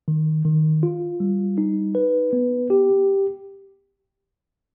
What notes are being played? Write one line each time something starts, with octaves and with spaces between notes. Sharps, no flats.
D#3
D#3
F4
G3
D#4
B4
B3
G4